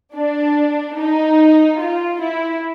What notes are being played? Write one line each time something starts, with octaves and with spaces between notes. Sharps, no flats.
D4
D#4
F4
E4